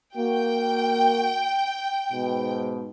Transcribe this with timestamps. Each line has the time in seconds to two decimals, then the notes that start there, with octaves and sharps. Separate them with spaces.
0.16 A#3 F#4 G5
2.12 G#2 B2